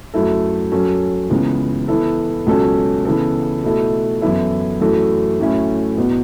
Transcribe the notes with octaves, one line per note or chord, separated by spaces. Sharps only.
F#2 F#3 A3 E4 A4
F#2 F#3 C#4 F#4 A4
C#2 C#3 E3 B3
E3 B3 E4 A4
C#2 B2 F#3 C#4 A4
C#3 E3 B3 A4
B2 A3 E4 A4
F#2 E3 B3 E4 A4
F#2 E3 A3 F#4 A4
A2 F#3 A3 C#4 E4
E2 B2 B3